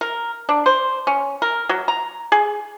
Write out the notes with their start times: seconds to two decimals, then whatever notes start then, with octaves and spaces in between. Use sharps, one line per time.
0.01 A#4
0.49 D4
0.66 C5
1.07 C#4
1.42 A#4
1.69 F#3
1.88 A#5
2.32 G#4